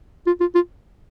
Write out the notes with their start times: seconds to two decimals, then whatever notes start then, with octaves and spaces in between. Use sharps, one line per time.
0.27 F4
0.40 F4
0.55 F4